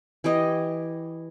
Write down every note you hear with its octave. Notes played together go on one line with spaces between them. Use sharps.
E3 G4 D#5 G5